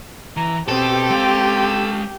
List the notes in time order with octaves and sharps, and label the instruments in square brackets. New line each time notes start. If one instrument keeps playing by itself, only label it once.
[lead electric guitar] E3 [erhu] A#5
[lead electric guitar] B2 [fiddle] C4 [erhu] G4 [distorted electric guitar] A4
[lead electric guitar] G#3 F5